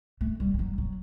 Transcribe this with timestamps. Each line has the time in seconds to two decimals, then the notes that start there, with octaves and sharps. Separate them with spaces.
0.21 A3
0.40 G3
0.54 G3
0.59 F#3
0.78 F#3